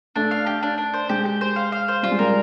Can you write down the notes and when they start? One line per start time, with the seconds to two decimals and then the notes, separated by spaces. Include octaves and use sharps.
0.16 A3 D4
0.31 F5
0.46 G4
0.63 D4
0.78 D4
0.94 C5
1.09 G#3 G4
1.25 G4
1.41 C5
1.56 F5
1.72 F5
1.88 C5
2.03 G3 F4
2.11 G#3
2.19 G3 A#4